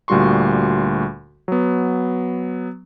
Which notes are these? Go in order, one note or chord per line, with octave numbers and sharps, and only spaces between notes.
D2 A#2 G3 F#4 C6 C#6
F#3 B3